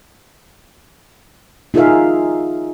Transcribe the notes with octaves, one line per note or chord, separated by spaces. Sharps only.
D#4 F4 G#4 A#4 E5 F5